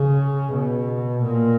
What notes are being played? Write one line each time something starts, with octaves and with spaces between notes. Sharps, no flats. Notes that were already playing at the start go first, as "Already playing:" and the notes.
Already playing: C#3
B2
A#2